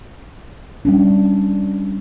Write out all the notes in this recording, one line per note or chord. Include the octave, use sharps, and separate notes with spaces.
G3 C#4 D4